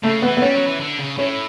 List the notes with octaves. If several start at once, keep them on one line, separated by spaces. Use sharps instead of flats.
C#3 A3
E3 B3
B3
G3 C#4
F#3
E3
D3
C#3
A2 C#4